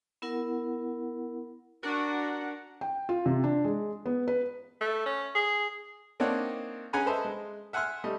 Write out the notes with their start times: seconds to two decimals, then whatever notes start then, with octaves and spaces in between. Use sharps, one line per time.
0.22 B3 E4 A#4 F#5
1.83 D4 F#4 A#4 F#5
2.81 G5
3.09 F4
3.26 C3
3.44 D4
3.65 G#3
4.06 B3
4.28 B4
4.81 A3
5.06 C#4
5.35 G#4
6.20 A#3 C4 D4 D#4 C#5 F#5
6.93 C#4 G#4 F#5 G#5 A#5 B5
7.06 A4 B4 C5 D#5 E5
7.25 G#3
7.73 E5 F#5 G#5 C6 F6 F#6
8.04 G3 A3 D#5